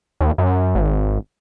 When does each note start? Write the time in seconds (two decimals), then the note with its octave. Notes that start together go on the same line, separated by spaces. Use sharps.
0.21 D#2
0.38 F#2
0.75 G#1